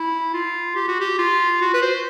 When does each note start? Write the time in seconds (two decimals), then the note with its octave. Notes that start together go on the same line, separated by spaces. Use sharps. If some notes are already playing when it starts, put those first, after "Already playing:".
Already playing: E4
0.34 F4
0.76 G4
0.88 F#4
1.01 G4
1.19 F4
1.61 F#4
1.74 B4
1.82 C5